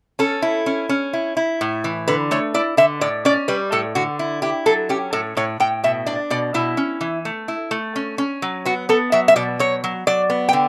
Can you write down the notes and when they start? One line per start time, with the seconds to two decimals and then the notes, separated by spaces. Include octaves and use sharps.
0.19 C#4 A4
0.42 E4
0.66 C#4
0.89 C#4
1.13 E4
1.37 E4
1.61 A2
1.84 E3
2.08 D3 B4
2.31 A3 C#5
2.54 E4 D5
2.77 D3 E5
3.01 A2 D5
3.25 C#4 D5
3.48 G3 B4
3.72 A2 A4
3.95 D3 F#4
4.19 E4
4.42 E4 G4
4.66 F#3 A4
4.89 C#4 G4
5.13 A2 A4
5.37 A2 C#5
5.60 A2 G5
5.84 B2 E5
6.06 D4 D5
6.30 B2 D5
6.54 B2 E4
6.77 C#4
7.01 E3
7.25 A3
7.48 E4
7.71 A3
7.96 C#4
8.18 C#4
8.42 F#3
8.65 B3 F#4
8.89 B3 A4
9.12 F#3 E5
9.28 E5
9.36 B2 D5
9.59 F#3 C#5
9.84 F#3
10.07 F#3 D5
10.30 B3
10.49 G5
10.53 D3